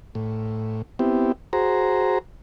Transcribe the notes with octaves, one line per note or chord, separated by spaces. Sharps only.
A2
B3 C4 E4 G4
F#4 G#4 C5 A#5